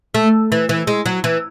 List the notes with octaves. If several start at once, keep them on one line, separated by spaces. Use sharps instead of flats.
A3
E3
E3
G#3
F#3
E3